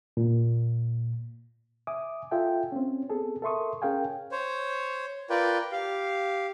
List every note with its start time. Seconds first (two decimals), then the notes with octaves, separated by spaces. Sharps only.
0.17 A#2
1.87 E5 G#5 D6 D#6
2.31 F4 A4 E5 G5 G#5
2.72 C4 C#4
3.10 B3 C4 G#4 A4
3.42 A4 A#4 E5 C6 C#6 D#6
3.82 C#4 G#4 A#4 F5 G5 G#5
4.31 C5 C#5
5.30 F4 A#4 B4 D5 G5
5.72 G4 F5